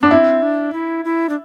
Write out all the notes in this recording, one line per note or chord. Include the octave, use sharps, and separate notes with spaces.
B3 D4
C4 E4
D4
E4
E4
D4